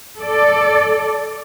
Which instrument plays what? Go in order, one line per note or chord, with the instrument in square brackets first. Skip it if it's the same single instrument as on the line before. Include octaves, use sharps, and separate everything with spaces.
[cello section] A4 D5